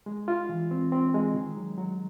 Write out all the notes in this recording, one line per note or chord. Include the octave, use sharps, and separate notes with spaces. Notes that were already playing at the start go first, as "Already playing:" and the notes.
G#3
F4
E3
C4
C4
G#3
D#3
F#3
F#3